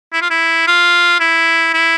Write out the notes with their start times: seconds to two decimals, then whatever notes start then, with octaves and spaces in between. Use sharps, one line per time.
0.13 E4
0.21 F4
0.30 E4
0.67 F4
1.20 E4
1.73 E4